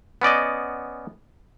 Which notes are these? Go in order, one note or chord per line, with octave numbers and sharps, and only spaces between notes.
B3 C#4 D5 D#5